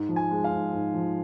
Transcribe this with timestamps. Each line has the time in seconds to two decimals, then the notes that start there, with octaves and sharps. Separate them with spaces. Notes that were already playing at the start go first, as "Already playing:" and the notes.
Already playing: G#2
0.09 F3
0.16 G#5
0.31 G#3
0.44 F5
0.52 G#2
0.73 G#2
0.94 F3